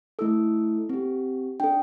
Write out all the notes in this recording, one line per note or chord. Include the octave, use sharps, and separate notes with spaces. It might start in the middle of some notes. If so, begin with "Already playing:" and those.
A3 E4 A4 E6
C4 G4
D4 A4 G5